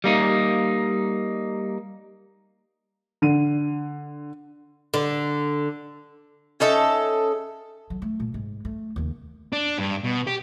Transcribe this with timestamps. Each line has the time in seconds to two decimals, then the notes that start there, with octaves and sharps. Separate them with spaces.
0.04 G3 A#3 D#4
3.22 D3 D#7
4.94 D3
6.60 C#4 D#4 A4 E5
7.90 F#3
8.02 A3
8.20 A#2
8.34 G#2
8.65 A3
8.96 D#2 C#3
9.53 D4
9.78 G2
10.04 B2
10.27 G4